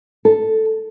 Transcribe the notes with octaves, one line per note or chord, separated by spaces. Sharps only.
A4